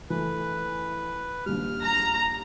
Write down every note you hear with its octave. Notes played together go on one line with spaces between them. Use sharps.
E3 A3 B4
A#1 D#2 G3 F6
A#5